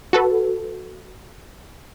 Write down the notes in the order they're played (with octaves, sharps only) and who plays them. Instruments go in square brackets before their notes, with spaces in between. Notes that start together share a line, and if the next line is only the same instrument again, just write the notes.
[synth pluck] F#4 A4 B4